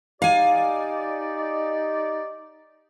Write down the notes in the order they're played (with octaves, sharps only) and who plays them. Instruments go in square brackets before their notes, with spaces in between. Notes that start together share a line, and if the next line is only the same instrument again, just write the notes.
[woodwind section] D#4 G4 D5 [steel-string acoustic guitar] F5 G#5